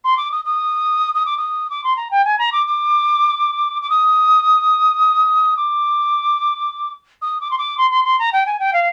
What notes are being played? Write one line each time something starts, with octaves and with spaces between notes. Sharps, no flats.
C6
D6
D#6
D#6
D#6
D6
D#6
D6
C6
A#5
G5
G#5
A#5
D6
D6
D6
D#6
D6
D#6
D6
C6
D6
C6
C6
C6
A#5
G5
G#5
G5
F5